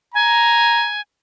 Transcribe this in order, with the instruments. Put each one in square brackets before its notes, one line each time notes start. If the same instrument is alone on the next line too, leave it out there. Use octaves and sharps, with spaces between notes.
[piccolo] G#5 [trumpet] A#5